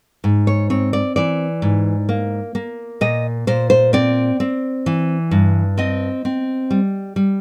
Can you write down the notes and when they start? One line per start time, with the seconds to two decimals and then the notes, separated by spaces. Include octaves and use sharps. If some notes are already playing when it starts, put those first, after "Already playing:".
0.24 G#2
0.47 C#5
0.70 C4 C#5
0.93 D5
1.16 E3 D5
1.62 G#2
2.09 A#3
2.55 A#3
3.01 A#2 D#5
3.47 A#2 C5
3.70 C5
3.93 C4 D5
4.40 C4
4.86 E3
5.31 G2
5.78 C4 D#5
6.25 C4
6.70 G3
7.16 G3